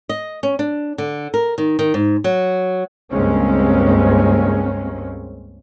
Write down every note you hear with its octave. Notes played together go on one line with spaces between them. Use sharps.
D#5
C#4
D4
D3
A#4
D#3
D#3
G#2
F#3
C#2 G2 G#3 A#3 C4 C#4